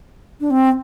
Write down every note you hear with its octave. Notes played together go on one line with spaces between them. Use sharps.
D4
C4